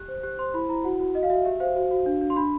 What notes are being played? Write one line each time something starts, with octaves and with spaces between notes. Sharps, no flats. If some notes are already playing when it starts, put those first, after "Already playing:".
Already playing: G4 F#6
C5
G4 F#6
C5 C6
E4 B5
E4 A#5
F#4 F#5
F#4
F#4 D#5
F5
F#4 E5
G4 E5
C5 F5
F#4
F#4
D4
D4
C6
D4 B5